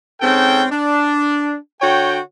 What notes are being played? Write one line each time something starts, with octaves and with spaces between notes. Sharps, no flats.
G#2 C4 C#4 A4 G5
D4
D3 F#4 C#5 G5